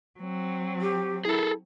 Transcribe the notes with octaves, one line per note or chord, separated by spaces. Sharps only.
F#3 C4
G4
E4 G#4 A4